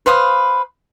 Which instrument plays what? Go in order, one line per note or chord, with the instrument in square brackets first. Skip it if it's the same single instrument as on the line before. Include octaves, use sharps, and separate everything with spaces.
[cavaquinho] B4 C5 F5 D#6